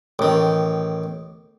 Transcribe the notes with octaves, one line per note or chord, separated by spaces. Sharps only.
A1 D#3